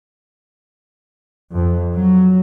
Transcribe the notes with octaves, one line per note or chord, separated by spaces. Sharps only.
F2
F#3